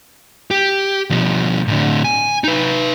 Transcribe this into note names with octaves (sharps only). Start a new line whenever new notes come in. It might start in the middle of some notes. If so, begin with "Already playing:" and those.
G4
B2 F3
A2 D3
G#5
D#4 B4